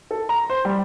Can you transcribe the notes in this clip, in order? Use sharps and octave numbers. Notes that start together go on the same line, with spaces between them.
A4
A#5
C5
G3